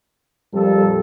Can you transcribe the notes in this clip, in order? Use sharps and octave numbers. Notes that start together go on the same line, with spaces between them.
F2 A#2 G3 A4